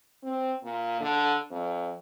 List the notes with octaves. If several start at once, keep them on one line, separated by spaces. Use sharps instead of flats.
C4
A#2
D3
F2